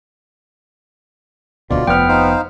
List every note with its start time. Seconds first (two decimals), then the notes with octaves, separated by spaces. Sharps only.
1.70 D#1 D2 B2 F4 D5
1.87 F1 F3 B3 G5 F6
2.09 D#4 C5 F5